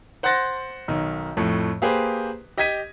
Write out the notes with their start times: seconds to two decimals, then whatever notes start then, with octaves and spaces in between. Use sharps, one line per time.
0.23 C5 F#5 C6 F#6 A6 A#6
0.88 B1 D#3
1.37 F2 A2 A3
1.82 A#3 G4 G#4 B4 C5
2.58 G4 D#5 D#6 G#6 B6 D#7